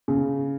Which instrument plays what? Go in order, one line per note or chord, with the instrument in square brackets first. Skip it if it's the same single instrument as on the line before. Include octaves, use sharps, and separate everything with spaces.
[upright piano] C#3